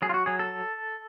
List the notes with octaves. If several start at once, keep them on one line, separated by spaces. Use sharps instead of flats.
F#3 G#4
F4
F#4
F#3 G#4
A4